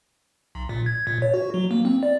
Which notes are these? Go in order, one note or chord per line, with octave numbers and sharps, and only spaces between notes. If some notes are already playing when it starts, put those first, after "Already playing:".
B1
A#2
G#6
A#2
C#5
F#4
F#3
A#3
C4
D5